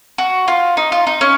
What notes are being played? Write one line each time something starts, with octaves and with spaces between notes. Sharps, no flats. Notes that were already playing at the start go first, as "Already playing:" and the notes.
F#4
F4
D#4
F4
D#4
C#4